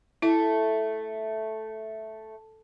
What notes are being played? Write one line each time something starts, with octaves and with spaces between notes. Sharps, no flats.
A3 E4